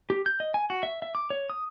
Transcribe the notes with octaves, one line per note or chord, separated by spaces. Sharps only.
G4
G6
D#5
G#5
F#4
E5
E5
D6
C#5
D#6